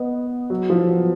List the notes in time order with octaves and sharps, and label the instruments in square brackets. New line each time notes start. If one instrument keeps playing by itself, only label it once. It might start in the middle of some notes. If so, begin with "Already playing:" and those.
Already playing: [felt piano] B3 D#5
[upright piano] F#3
F3
F#3